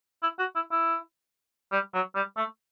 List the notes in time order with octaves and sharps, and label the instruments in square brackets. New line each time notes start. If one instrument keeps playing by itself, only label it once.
[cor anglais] E4
F#4
E4
E4
G3
F#3
G3
A3